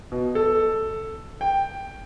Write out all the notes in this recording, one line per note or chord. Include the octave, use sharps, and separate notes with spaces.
B2
A4
G5